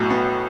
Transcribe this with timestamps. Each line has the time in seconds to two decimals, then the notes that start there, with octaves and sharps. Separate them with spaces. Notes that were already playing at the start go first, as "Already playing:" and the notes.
Already playing: B1 A2 F#3
0.10 B3